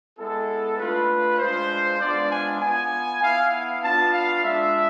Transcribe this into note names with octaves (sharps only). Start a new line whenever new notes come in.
G#3 B3 E4 A4
A3 D4 F4 B4
G#3 D4 F4 C5
G#3 B3 D4 F4 D5
G#5
B3 F4 G#5
B3 E4 F5
F5
B3 D4 F4 A5
F5
G#3 D4 F4 E5